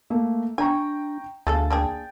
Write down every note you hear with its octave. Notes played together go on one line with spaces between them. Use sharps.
A3 A#3
D4 G5 G#5 A#5 C#6
D2 A3 G#4 A4 F5 A6
A#3 D4 G#4 G5